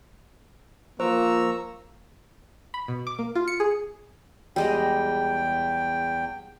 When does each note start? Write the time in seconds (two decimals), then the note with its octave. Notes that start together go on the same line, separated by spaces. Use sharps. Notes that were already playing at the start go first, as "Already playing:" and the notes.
1.00 F3 A#3 C5 A#5 C#6 E6
2.74 B5
2.88 B2
3.07 D6
3.19 A#3
3.35 F4
3.48 C#7
3.60 G#4
4.56 E2 G3 G#3 D#5 G5